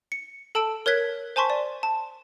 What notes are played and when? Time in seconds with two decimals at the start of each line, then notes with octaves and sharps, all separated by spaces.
0.12 C#7
0.55 A4 A5 E6 D7
0.86 A#4 C#5 F#6 G#6 B6
1.36 C5 G#5 A5 C6 C#6 B6
1.50 D5
1.83 A5